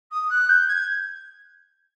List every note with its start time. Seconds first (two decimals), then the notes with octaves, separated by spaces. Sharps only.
0.11 D#6
0.30 F#6
0.49 G6
0.68 G#6